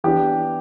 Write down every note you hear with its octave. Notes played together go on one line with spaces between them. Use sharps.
E3 B3 D4 G4